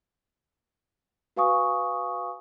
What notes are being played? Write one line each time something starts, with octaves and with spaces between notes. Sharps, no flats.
F#4 B4 F5 G#5 C#6 D#6